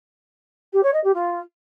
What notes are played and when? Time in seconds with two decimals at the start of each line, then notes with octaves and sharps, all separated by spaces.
0.73 G4
0.83 C#5
0.93 D#5
1.03 G4
1.14 F4